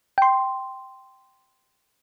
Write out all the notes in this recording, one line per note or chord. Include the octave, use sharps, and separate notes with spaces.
G5 C6